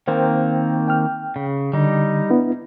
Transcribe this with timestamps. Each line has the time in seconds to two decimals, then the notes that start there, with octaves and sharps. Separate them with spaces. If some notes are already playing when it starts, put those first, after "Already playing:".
0.08 D#3 A#3 C4 C5 G5
0.88 G5 F6
1.36 C#3
1.73 D3 G3 D#4
2.30 B3 D4 E4